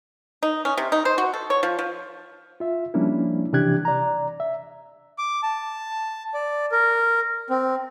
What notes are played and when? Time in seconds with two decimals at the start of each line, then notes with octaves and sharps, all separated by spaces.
0.43 D#4
0.65 C#4
0.77 C3
0.92 D#4
1.05 C5
1.18 F#4
1.34 A4
1.50 C#5
1.63 F3
1.79 F3
2.60 F4 E5
2.94 F3 G3 A#3 C#4 D4 E4
3.53 C3 E3 D4 G4 F#6 G#6
3.85 D5 A#5
4.40 E5
5.18 D6
5.43 A5
6.34 D5
6.72 A#4
7.50 C4